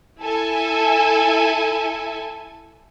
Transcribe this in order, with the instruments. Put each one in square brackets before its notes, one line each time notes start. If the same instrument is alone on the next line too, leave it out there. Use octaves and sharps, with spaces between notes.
[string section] E4 A4 G#5